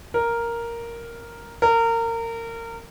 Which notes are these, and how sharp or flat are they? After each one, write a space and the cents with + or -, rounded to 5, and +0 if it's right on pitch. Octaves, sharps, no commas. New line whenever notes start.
A#4 +0
A#4 -25